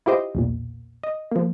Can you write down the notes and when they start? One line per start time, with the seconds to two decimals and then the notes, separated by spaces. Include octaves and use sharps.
0.06 E4 F4 G4 C5 D#5
0.35 B1 E2 A#2
1.03 D#5
1.31 F3 A#3